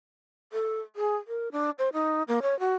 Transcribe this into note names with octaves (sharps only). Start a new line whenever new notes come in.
A4
G#4
A#4
D4
C5
D#4
A#3
C#5
F#4